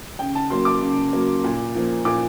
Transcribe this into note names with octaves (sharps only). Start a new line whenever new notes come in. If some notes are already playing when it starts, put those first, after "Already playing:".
C#3 G5
A5
F#3 A#3 C6
D6
C#3
F#3 A#3
A#2
F3 A#3
A#2 D6